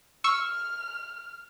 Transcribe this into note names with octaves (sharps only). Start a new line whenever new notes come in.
C#6 E6 F6